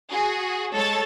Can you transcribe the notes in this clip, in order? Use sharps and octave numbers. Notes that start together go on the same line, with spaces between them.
F#4 G#4
G#3 A4 C#5 A6